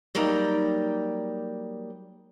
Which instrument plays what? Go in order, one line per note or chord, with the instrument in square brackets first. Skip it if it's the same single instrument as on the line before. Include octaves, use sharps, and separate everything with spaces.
[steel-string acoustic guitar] F#3 G3 A#3 D#4